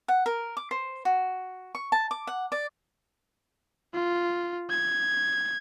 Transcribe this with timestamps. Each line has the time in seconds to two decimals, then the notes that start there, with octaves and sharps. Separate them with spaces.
0.08 F#5
0.26 A#4
0.57 D6
0.71 C5
1.05 F#4
1.75 C#6
1.92 A5
2.11 D6
2.27 F#5
2.52 D5
3.94 F4
4.70 G#6